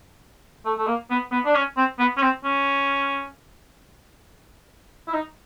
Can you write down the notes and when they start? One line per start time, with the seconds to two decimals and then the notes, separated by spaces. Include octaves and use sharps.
0.66 A3
0.78 A3
0.87 A#3
1.11 B3
1.32 B3
1.45 D4
1.55 C#4
1.77 C4
1.99 B3
2.17 C#4
2.22 C4
2.44 C#4
5.08 E4
5.13 D#4